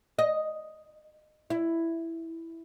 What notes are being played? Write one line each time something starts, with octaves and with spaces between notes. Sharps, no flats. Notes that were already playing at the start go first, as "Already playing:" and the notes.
D#5
E4